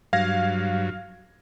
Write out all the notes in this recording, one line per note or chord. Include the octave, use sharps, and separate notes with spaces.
G2 F#3 F5 G#6 A#6